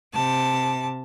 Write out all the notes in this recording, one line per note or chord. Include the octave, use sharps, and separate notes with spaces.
C3 A5